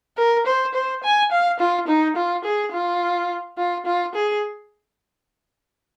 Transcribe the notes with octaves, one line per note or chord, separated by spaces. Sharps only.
A#4
C5
C5
G#5
F5
F4
D#4
F4
G#4
F4
F4
F4
G#4